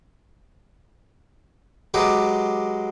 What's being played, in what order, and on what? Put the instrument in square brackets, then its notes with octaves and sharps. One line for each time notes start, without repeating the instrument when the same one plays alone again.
[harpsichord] F#3 G#3 G4 B4 D6